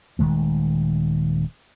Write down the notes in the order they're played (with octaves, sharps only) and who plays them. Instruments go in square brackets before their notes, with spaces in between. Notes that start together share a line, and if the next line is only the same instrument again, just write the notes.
[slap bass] D#1 D#3 G#3 A3